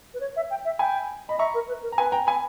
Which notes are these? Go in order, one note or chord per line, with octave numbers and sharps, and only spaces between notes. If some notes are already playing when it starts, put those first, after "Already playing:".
B4
C#5
E5
G5
E5
G5 G#5 B5
D#5 B5
E5 A#5 C#6
A#4
B4
A#4
A#5
B4 G#5 B5
G5 A#5
G#5 B5